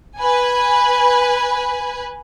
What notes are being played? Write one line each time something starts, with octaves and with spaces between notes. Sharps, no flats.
B4 G#5